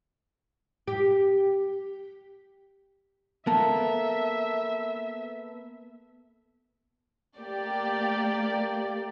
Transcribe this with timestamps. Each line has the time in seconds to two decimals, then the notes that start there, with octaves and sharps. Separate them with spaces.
0.87 G4
3.47 A#3 B3 A4 E5 A5
7.38 A3 A#3 G4 D5